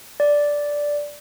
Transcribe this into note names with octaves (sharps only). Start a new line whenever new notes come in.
D5